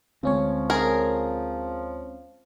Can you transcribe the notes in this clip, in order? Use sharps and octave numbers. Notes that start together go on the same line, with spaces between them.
D2 F3 G#3 C4 C#4 C#5
G#4 A#4